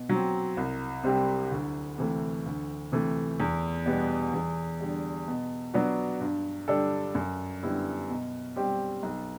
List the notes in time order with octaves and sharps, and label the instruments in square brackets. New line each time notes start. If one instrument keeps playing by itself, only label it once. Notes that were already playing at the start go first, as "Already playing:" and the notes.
Already playing: [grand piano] B2
F#3 C4
C2
C3 G3 C4 G4
D2
C3 E3 A3
D2
C3 E3 A3
E2
B2 G3 B3
E2
D3 G3
B2
F#3 B3 D4 F#4
G2
D3 G3 D4 A4
F#2
D3 G3 B3 E4
B2
G3 C4 G4
B1